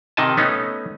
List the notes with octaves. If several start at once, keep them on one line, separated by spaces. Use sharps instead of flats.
C3 D#3 D#4 D#5 G#5 A5
A3 B3 C#4 D#4